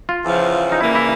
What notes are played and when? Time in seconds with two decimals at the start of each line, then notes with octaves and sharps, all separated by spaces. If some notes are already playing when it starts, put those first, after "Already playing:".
0.09 F4
0.23 E2 C#3 F3
0.72 D#4
0.81 C#3 E3 G3 A#3 E4
0.95 E4